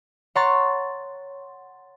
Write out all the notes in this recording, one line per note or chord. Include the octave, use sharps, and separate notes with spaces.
C#5 F#5 A#5 C6 C#6 A6